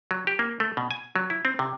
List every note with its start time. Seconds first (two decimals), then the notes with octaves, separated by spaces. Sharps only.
0.11 F#3
0.27 G4
0.39 A#3
0.60 A3
0.77 B2
0.91 G#5
1.16 F#3
1.30 E4
1.45 C4
1.59 C3